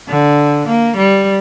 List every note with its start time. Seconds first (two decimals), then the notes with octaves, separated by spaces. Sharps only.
0.08 D3
0.67 A#3
0.96 G3